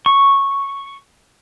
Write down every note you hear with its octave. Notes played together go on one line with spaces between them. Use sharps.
C#6